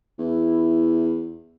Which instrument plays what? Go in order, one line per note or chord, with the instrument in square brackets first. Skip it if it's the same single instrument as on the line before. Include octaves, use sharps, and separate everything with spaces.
[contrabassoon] E2 [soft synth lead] E4